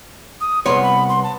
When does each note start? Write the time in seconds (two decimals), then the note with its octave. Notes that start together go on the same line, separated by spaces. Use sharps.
0.41 D#6
0.66 C2 F#2 B3 C#5 C6
0.83 B5
1.09 C6
1.23 A5